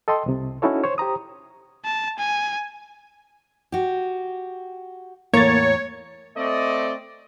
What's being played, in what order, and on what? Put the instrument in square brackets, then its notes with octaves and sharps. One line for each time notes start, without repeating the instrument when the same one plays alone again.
[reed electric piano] A4 D#5 G5 C6
C2 C3
C#4 D#4 E4 F#4 A4 C#5
C5 C#5
G4 C5 A#5 D#6
[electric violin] A5
G#5
[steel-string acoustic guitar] F#4 G4
[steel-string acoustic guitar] E2 A2 A#5 [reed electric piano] A#3 A6 [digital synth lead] C#5
[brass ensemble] A3 C4 D5 D#5